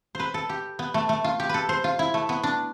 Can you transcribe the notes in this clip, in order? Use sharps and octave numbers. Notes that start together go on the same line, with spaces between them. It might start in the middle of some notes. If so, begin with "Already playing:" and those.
B4 C5
A4
G4
B3
A3
A3
F4
G4
A4 B4
C5
F4
E4
A3
B3
D4